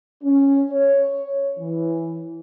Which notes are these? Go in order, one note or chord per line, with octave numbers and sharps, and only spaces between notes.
C#4
C#5
E3